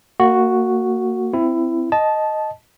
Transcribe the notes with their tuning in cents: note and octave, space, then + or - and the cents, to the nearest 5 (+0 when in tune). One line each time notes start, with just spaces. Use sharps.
A#3 -25 F#4 +0
C4 -15 E4 +15
D#5 +0 A5 -15